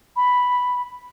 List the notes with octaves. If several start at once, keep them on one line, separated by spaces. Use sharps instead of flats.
B5